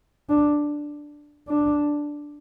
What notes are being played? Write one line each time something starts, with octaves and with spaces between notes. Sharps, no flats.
D4
D4